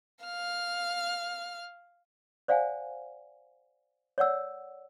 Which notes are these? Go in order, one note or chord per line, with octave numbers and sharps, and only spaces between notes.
F5 F6
C5 D5 F5 F#5 G#5
C#5 D5 F#5 E6